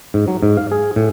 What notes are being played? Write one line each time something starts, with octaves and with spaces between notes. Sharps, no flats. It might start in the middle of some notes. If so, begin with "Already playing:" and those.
G#2
F#3
G#2
F5
G#4
A2